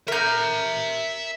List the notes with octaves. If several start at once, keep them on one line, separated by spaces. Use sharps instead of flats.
A#4 E5 A#5 G6